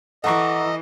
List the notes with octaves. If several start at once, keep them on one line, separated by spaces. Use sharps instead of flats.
E3 A4 D#5 F#5 A#5 C#6 D6